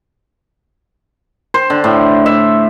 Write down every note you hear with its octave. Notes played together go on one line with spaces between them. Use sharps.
C5
D3
A2
E5